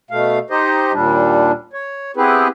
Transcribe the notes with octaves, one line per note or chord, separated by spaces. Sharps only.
B2 A3 F5
D#4 G4 C5 D#5
D#2 A#2 G3 D4
C#5
B3 C4 E4 G4 G#4 B4